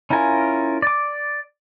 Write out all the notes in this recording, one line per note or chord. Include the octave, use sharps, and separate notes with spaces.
C#4 E4 F4 A#4 G#5
D5 D6